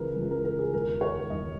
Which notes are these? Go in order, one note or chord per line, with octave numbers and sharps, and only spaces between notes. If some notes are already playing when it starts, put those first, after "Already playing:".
Already playing: C#2 C#3 E3 A#4 B4
C#2 C#3 E3
A#4
A#4
G#4
E1 D#2 D#3 A#4
C#5
E1 D#2 D#3 D#5